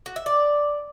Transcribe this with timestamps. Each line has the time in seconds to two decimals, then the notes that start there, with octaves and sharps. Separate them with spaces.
0.06 F#4
0.16 E5
0.26 D5